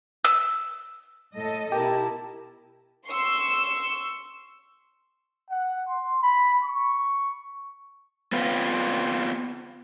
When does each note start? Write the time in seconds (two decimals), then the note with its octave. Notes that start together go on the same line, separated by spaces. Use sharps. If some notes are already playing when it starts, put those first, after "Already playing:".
0.25 E6
1.35 A2 A4 D#5
1.72 B2 E4 G4 A#4 A5
3.08 C6 C#6 E6
5.50 F#5
5.88 C6
6.22 B5
6.64 C#6
8.32 B3 C4 F4 B4